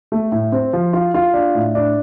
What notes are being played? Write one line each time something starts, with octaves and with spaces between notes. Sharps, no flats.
A3
A2
C4
F3
F4
F4
D4
A2
D4